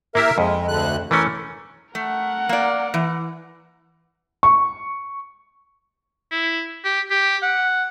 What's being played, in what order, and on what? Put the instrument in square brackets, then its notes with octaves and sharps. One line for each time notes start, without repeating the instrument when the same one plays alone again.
[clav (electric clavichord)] A#3 E4 G4 [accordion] A#4 E5
[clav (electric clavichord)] F2 [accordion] G#3
[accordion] D2 D3 F#6
[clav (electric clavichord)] E3 A3 C#4 [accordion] A#4
[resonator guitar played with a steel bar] A3 [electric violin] A#4 F#5
[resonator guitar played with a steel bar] A#3 D5
E3
[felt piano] C#6
[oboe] E4
G4
G4
F#5